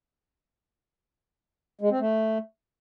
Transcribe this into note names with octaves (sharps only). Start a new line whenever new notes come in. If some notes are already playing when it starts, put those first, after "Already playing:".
G#3
C4
A3